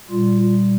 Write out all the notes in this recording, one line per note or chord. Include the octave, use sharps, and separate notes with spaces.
A#2 G3 F4